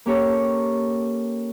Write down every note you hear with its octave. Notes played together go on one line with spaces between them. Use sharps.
A#3 C#4 G4 A4 C#5 A#5